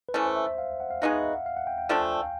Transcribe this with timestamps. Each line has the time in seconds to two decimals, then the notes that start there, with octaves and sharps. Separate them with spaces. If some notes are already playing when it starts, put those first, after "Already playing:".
0.09 B4
0.14 E3 A3 C#4 C5
0.26 C5
0.36 E5
0.47 E5
0.58 F5
0.80 F#5
0.90 F5
1.02 G#3 B3 D#4 F#4 F5
1.13 E5
1.24 E5
1.35 F#5
1.46 F5
1.57 F#5
1.67 G5
1.78 G5
1.89 D3 F3 A3 D4 G5
2.01 G#5
2.12 G5
2.23 F5